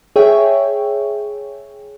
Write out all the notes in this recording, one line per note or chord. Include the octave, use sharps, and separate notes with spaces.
G#4 C#5 E5 G5